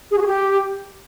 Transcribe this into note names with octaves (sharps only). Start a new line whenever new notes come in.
G#4
F#4
G#4
G4